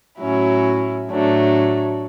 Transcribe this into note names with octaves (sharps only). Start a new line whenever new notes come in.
A2 F#3 C#4 E4
A2 F#3 A3 D4